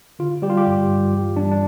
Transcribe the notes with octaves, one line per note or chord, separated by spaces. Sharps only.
D3 F4
G3 G4
F4
G4
G2
G2
E3
G3 D4
D4